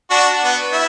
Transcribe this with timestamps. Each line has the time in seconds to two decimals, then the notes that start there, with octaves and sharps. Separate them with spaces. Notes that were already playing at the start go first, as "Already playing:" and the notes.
0.10 D4 F#4
0.44 B3
0.73 E4